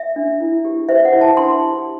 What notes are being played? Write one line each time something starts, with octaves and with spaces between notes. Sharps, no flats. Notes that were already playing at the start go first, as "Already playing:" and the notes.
Already playing: E5
D4
E4
G4
C5 E5
F#5
E4
A5
D4 C6
G4